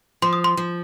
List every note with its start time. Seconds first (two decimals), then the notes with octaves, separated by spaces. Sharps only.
0.22 F3 C6
0.33 D#6
0.44 C6
0.57 F3